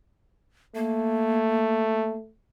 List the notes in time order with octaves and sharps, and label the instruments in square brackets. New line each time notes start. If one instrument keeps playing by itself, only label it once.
[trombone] A3 [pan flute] A#3